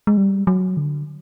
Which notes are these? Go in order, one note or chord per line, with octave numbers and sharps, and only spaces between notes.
G#3
G3
F#3
D3